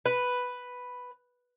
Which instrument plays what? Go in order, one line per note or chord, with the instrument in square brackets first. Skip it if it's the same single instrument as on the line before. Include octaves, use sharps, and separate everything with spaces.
[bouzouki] B4